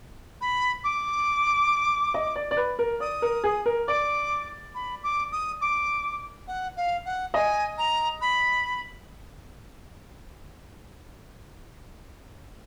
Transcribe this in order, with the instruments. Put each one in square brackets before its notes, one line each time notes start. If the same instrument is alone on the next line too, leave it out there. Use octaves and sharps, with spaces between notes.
[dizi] B5
D6
[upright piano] D#5
D5
D5
B4
A#4
[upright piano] D5 [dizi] D#6
[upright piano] A#4
G#4
A#4
[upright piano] D5 [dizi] D6
[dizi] B5
D6
D#6
D6
F#5
F5
F#5
[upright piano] D#5 [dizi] G#5
[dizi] A#5
B5